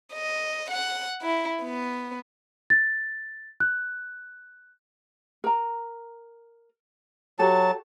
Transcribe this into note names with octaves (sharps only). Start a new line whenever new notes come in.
D#5
F#5
E4
B3
A6
F#6
A#4 A#5
F#3 F#4 G4 A4 A5